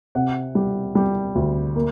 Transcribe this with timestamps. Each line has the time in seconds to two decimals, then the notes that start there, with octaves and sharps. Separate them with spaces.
0.15 C3 F#5
0.55 G3
0.95 G3
1.35 D2
1.76 A#3